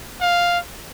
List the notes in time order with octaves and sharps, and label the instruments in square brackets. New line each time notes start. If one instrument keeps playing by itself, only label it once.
[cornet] F5